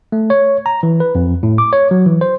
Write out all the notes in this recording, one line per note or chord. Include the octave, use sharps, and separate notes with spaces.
A3
C#5
A#5
E3
B4
F2
A2
D6
C#5
F#3
E3
C5